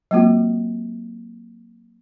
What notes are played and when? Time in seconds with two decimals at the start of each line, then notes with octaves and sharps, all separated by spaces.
0.11 F#3 G#3 A#3 C4 F4 F#4